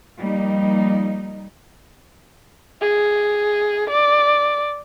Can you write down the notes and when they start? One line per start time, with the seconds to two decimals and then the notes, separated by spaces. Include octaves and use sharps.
0.17 F3 G3 A#3 D#4
2.81 G#4
3.90 D5